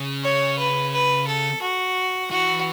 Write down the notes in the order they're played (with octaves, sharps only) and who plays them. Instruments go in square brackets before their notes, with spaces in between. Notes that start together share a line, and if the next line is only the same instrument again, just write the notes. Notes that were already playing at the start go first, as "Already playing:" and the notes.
Already playing: [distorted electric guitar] C#3
[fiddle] C#5
B4
B4
A4
F#4
[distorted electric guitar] E3 [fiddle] F#4